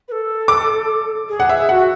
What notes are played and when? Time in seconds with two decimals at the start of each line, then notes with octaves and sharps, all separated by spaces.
0.08 B4
0.11 A4
0.48 D6
1.29 G#4
1.40 F#5
1.49 E5
1.69 F#4 F#5